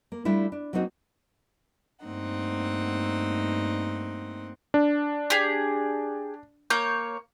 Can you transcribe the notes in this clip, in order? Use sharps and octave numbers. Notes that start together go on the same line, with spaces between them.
A#3
G3 A3 D4 E4 F4
D4
F#3 A#3 C4 D#4 F#4
G2 A3 A#3 C4 D#4 F#5
D4
G4 G#4
A#3 C#5 G6